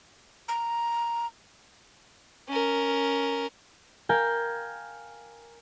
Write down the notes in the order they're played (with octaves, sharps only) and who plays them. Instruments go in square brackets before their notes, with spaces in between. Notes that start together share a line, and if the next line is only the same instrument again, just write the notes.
[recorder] A#5
[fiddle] C#4 A#4
[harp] A#4 F5 G5 G#5